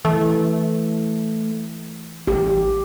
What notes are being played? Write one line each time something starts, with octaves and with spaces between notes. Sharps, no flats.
E3 A3
A1 G4